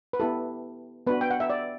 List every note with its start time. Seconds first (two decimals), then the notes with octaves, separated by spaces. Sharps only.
0.13 B4
0.20 B3 E4 G4 A4
1.07 B3 D4 F#4 B4
1.21 G5
1.30 F#5
1.40 E5
1.50 D5